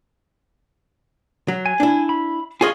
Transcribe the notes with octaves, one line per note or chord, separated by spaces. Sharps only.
F#3
G#5
D4 E4
B5
F4 G#4 D#5 G#5 C#6 F6